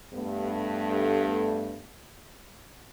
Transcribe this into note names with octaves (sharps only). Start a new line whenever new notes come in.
G2 A3 B3